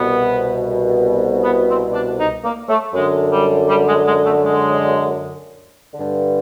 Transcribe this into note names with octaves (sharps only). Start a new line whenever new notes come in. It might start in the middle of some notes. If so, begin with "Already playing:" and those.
Already playing: C2 B2 B3
B3
C4
D4
D#4
A#3
A3
F#2 D3 G#3
G3
G3
G#3
G#3
A3
G#3
G2 D3